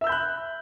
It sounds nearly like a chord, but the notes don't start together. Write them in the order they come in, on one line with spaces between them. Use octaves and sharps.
E5 E6 G6 B5 F#6